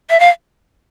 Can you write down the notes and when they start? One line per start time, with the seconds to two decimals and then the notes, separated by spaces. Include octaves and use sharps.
0.10 E5
0.20 F5